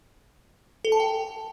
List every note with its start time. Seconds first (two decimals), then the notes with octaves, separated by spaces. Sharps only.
0.85 A4
0.92 A5
1.00 G5